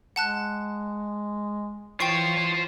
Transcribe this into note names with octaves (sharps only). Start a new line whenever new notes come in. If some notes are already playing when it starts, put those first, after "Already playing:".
G#3 F#5 A5 F#6
E3 F4 C5 C#5 G5 C#6 C7